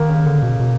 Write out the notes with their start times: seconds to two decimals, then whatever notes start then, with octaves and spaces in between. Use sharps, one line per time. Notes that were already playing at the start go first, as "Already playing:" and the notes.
Already playing: D#3 A#3
0.09 C#3
0.26 D3
0.43 B2
0.60 B2